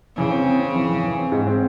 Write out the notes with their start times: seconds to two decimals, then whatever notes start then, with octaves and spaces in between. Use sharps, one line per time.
0.17 C#3 E3
0.31 C4
0.46 C4
0.60 C4
0.74 E3
0.89 E3
1.04 E3
1.18 C4
1.32 G#2
1.47 C4